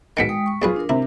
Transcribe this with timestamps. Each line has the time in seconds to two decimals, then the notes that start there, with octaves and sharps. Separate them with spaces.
0.17 G#2 B2 D#3 B6 C#7 D7
0.29 G#3 G5 D#6
0.46 C#6
0.62 B1 G3 F4 G#4 B4
0.76 D4 A#4
0.89 C3 E4